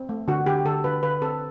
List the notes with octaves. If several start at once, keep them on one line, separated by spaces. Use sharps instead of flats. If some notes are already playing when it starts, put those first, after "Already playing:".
Already playing: C4
A3
D3 F#4
D3 G4
D3 A4
D3 B4
D3 B4
C4 A4